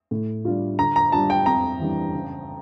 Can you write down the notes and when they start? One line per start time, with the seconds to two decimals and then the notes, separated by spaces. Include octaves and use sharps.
0.11 A2
0.45 G3 D4 F4
0.78 D3 A#5
0.96 A#5
1.12 G3 D4 F4 A5
1.30 G5
1.46 F2 A#5
1.80 E3 G3 D4
2.14 C#3